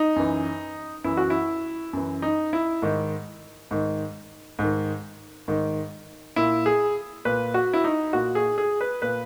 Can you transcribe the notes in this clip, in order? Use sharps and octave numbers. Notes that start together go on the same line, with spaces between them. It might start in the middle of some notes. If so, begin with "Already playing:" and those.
Already playing: D#4
F#2 E3
F#2 E3 E4
F#4
E4
F#2 E3
D#4
E4
G#2 D#3
G#2 D#3
G#2 D#3
G#2 D#3
A#2 E4
G#4
A#2 B4
F#4
E4
D#4
A#2 F#4
G#4
G#4
B4
A#2 B4